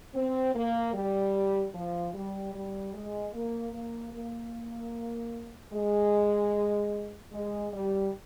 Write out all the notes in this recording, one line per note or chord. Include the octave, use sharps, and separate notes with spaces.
C4
A#3
G3
F3
G3
G3
G#3
A#3
A#3
A#3
G#3
G#3
G3